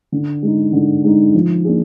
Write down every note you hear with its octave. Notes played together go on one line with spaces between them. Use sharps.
D3
G#3 D#4
D3
G#3 D#4
F3
A#3 D4 G#4